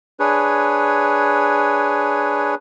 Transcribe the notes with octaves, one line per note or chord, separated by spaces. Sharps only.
D4 G#4 B4 C#5